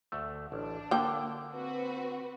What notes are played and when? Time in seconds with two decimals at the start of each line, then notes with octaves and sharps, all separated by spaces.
0.12 D2 A3
0.52 A1 D4
0.91 D3 A#3 G5
1.52 C4 F#4 B4